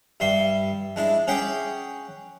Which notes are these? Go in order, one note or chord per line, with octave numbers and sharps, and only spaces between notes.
G2 G3 E5 C6
G#3 D4 E4
C#4 G#4 F#5 G5 B5 D6